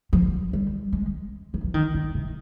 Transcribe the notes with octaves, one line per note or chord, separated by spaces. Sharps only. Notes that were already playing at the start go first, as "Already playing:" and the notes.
F3
G3
G#3
D#3
F3
D#3
D3
C3